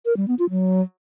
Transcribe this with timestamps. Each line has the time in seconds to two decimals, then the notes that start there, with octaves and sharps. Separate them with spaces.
0.06 A#4
0.17 G3
0.28 B3
0.39 F4
0.50 F#3